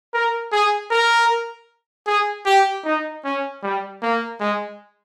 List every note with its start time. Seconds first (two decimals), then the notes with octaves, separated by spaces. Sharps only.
0.14 A#4
0.52 G#4
0.91 A#4
2.07 G#4
2.46 G4
2.85 D#4
3.25 C#4
3.63 G3
4.02 A#3
4.40 G#3